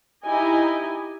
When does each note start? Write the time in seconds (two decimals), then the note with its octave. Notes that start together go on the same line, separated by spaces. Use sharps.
0.24 D#4 E4 G4 D#5 G#5